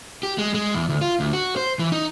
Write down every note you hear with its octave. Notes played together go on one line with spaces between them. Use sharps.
G4
G#3
G#3
E2
D2
F4
D2
F#4
C5
E3
D#4